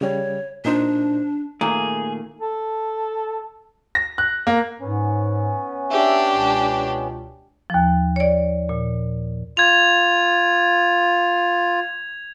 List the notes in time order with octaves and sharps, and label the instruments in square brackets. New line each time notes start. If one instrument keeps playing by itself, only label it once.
[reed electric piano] C#3 G3 [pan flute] C#5
[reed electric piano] A#2 D#4 C5 [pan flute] D4
[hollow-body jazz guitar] A#2 D#3 A3 [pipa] A#3 [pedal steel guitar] G#4
[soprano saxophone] A4
[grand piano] A#6
F#6
A#3
[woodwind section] G#2 [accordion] B3 C#4
[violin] D4 G4 [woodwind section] E5
[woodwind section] C#2 B2
[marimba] D#2 F3
C#5 D5
A#2
[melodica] F4 [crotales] G#6 F7